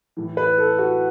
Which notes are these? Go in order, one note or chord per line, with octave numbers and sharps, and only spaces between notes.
A2 E3
B4
A4
F#4